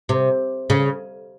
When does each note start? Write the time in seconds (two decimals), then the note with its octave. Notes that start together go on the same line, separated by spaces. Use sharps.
0.09 C3
0.70 C#3